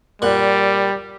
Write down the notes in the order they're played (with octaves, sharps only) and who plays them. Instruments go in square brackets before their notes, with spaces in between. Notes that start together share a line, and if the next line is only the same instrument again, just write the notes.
[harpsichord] A#2 F#5 [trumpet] G3